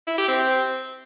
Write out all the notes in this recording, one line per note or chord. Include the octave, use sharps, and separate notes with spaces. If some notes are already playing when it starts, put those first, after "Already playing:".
E4
G4
C4